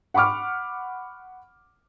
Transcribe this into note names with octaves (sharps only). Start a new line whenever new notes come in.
F#5 B5 C#6 D6 F6